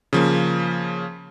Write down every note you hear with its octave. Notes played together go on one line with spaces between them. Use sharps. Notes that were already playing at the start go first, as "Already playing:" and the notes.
C#3 F3 A#3